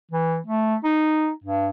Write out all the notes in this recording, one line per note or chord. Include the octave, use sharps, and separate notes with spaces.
E3
A3
D#4
G2